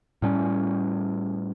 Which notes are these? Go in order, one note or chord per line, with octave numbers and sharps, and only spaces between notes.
A2 G3 C#4